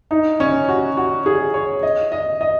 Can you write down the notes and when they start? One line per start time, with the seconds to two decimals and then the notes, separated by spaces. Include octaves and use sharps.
0.11 D#4
0.40 C#4
0.69 F#4
0.97 F#4
1.26 G#4
1.54 C#5
1.83 D#5
2.12 D#5
2.41 D#5